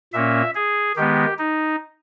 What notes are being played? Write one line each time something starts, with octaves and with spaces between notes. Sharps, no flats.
A#2 A#3 C#4 E5
G#4
D#3 G#3 B3 G4
D#4